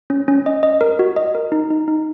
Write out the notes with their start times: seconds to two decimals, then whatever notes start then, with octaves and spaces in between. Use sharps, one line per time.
0.10 C#4
0.28 C#4
0.46 D#5
0.63 D#5
0.81 A#4
0.99 F#4
1.16 D#5
1.35 A#4
1.52 D#4
1.70 D#4
1.88 D#4